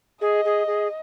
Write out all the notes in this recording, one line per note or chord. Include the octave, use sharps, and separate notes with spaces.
G#4 D#5
G#4
G#4